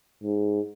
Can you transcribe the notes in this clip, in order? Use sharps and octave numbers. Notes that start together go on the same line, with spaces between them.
G#2